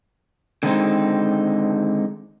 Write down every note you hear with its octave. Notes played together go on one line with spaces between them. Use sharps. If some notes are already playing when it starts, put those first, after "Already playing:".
D3 D#3 F#3 G#3 C4 D#4